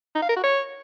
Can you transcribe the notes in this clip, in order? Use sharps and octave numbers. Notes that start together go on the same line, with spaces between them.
D#4
F5
A#4
F#4
C#5